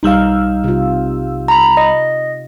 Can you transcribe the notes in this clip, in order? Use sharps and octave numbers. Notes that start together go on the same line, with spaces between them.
B1 G3 D#4 F5 E6
C3 F4
A#5 B5
D#5